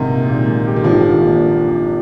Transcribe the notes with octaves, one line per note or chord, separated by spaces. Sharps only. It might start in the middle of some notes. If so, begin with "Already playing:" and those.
Already playing: A#1 G#2 C3 D#3
A#3
A#2
G#3
G4
D#3
G#1 D3 F3
G2
A#3